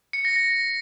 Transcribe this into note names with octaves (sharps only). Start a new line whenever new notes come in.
C#7
A#6
A#6